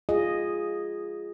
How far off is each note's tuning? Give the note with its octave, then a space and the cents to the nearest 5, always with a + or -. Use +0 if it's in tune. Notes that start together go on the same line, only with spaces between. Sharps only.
F4 +0 G#4 -10 D#5 +0